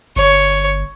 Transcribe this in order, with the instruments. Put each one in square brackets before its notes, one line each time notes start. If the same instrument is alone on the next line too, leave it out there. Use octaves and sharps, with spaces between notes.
[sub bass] G1 [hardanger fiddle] C#5